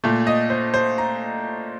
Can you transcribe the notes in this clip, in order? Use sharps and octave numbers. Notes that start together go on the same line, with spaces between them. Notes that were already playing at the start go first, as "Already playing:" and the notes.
A#2 A3
D#5
C5
C5
A#5